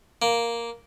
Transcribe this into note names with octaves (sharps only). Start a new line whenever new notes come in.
A#3